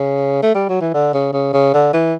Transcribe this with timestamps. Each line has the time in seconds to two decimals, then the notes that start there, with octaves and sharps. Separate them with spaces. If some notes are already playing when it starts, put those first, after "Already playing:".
Already playing: C#3
0.43 A3
0.55 G3
0.69 F#3
0.81 E3
0.94 D3
1.14 C#3
1.33 C#3
1.53 C#3
1.74 D3
1.93 E3